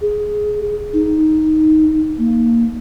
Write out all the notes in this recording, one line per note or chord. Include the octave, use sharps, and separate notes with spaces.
G#4
D#4
A#3